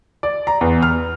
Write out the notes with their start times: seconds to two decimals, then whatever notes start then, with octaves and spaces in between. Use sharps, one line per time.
0.23 D5
0.47 A#5
0.61 E2
0.82 F6